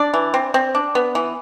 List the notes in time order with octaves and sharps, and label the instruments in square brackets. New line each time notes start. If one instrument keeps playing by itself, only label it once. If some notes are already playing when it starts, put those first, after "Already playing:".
Already playing: [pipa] D4 D5
E3
C4
C4
D4
B3
E3